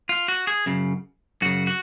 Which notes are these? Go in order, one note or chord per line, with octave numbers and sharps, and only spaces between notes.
F4
F#4
G#4
F#2 C#3
F#2 C#3 F#4
F#4